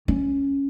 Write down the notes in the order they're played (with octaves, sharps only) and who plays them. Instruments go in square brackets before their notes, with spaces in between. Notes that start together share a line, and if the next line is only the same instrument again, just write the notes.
[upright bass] C#4